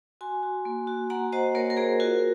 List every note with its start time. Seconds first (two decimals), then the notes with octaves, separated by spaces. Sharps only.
0.21 F#4 G#5 C6
0.43 F#4
0.65 A#3
0.87 F#4
1.10 A#3 F#5 A#5
1.32 F#4 C5 D#5
1.55 A#3 A#4 C#5
1.70 A#4
1.77 A#3 G#4 C5
2.00 F4 F#4 A#4